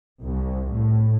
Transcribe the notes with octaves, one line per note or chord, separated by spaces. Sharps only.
C2
A2